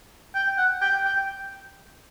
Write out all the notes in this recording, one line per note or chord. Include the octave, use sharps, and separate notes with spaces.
G5
F#5
G5
G5